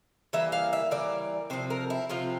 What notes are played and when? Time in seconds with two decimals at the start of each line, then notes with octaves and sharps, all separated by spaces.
0.33 E3 G3 A#3 E5
0.52 F5
0.73 E5
0.91 E3 G3 A#3 D5
1.50 C3 F3 C4 C5
1.70 A#4
1.90 E4
2.10 C3 F3 C4 F4